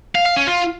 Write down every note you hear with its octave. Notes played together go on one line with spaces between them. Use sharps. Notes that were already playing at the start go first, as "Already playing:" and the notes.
F5
F5
C#4
F4